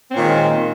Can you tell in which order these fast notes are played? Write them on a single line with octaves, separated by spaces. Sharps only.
C4 C#4 A#2 D#3 G#3